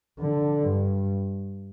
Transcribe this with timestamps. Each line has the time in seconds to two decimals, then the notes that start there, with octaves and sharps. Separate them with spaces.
0.20 D3
0.63 G2